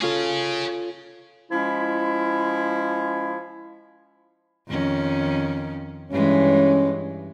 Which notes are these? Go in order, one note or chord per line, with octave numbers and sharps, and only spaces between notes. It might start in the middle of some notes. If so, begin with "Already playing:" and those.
C#4 F4 G#4 A4 C#5
F3 G#3 C#4 E4
F2 D#3 C#4
G2 E3 G#3 C#4